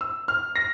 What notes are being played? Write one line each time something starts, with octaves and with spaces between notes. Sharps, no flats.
E6
F6
A#6